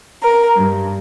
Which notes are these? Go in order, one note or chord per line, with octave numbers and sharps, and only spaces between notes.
A#4
G2